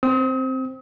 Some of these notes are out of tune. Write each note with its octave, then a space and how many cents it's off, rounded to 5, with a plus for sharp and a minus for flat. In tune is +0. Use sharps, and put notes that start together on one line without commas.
C4 +0 D#6 +40